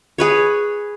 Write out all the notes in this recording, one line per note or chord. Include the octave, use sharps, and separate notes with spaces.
G#4 B4 C#5